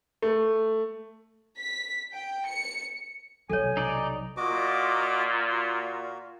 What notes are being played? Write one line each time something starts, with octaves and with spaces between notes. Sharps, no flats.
A3
B6
G5
C#7
B1 C3 F#3 A4 C#5 G#5
D#4 D5
A#2 F4 F#4 D#5 D6
F#4